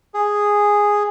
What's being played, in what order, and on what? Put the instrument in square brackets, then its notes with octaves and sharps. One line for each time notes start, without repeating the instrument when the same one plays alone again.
[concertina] G#4